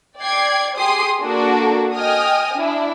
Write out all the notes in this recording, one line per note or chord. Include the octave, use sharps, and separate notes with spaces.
D5 G5 G#6 C7
G4 G#4 C6 D#6 C7
A#3 D4 F#4 A4
D#5 G5 G#5 D#6 F6
D4 E4